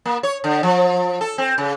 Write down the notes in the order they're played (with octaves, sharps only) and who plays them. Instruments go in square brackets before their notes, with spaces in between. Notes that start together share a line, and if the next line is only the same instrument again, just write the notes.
[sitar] A#3
C#5
D3
F3
A4
C4
C#3